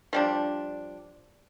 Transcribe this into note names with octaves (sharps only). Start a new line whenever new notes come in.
F3 G3 D4